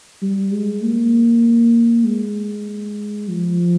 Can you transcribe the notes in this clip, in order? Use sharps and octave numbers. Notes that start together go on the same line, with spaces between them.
G3
G#3
A#3
G#3
F3